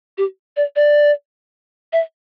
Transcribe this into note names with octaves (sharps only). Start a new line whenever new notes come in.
G4
D5
D5
E5